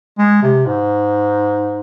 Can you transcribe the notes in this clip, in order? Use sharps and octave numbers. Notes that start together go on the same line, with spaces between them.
G#3
C3
G#2